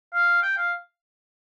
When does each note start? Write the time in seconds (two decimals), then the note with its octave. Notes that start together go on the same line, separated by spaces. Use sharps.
0.13 F5
0.42 G5
0.57 F5